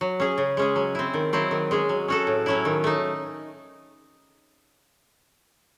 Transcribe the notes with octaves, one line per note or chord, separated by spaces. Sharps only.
F#3
C#4 G#4
C#3
G#3 C#4 G#4
F#3
C4 E4
D#3
F#3 C4 E4
D#3
G#3 C#4 G#4
F#3
C#4 F#4 A4
A2
F#3 C#4 E4
D#3
A3 D#4